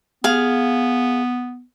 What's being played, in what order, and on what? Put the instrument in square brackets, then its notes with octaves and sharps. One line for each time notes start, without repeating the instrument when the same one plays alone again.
[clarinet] B3 [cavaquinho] G#4 F5